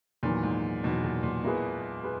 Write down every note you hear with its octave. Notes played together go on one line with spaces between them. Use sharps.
E2 A#2 D#3 F#3
G#2
E2 B2 D#3 F#3
A#2
A#2
B2 A#3 E4 G#4 B4
G#4 B4